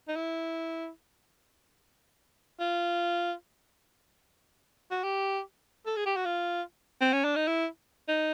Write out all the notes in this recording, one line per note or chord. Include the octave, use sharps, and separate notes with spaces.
D#4
E4
F4
F#4
G4
A4
G#4
G4
F#4
F4
C4
C#4
D4
D#4
E4
D#4